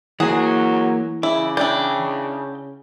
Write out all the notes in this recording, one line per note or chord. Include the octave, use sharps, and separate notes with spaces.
E3 F#3 A#3 G#4 F#5
C#3 E4 D6
D4 E4 G5 G6